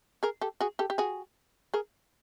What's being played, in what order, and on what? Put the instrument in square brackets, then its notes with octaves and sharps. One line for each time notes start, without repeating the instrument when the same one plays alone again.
[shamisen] G#4 A#4
G4 A4
F#4 G#4
G4 A4
G4
F#4 G#4
G#4 A#4